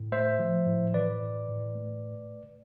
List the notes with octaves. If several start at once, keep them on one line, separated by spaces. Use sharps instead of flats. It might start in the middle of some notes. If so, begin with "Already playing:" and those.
Already playing: A2
A3 C5 E5
F3
A2
E3 B4 D5
A2
A2
A3